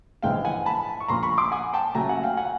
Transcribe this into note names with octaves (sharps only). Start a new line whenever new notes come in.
A#1 G#2 E3 G#3 F5 G5
F#5 G#5
A5 B5
C#6
A#1 A#2 F3 A#5 C6
B5 C#6
C6 D6
F#5 G#5
G5 A5
A#2 F#3 A3 C#4 G#5 A#5
F#5 G#5
F5 G5
F#5 G#5